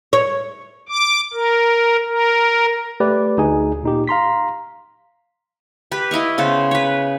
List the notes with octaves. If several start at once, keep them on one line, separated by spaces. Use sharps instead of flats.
C#5
D6
A#4
A#4
A3 G4 B4 D5
D2 D#4 G#4 G#5
A#2 D#4 G4
F5 A#5 C6 B6
G4 B4
E4 D#5 F5 C#6
C#3 B3 C5 C#5
B4 C#5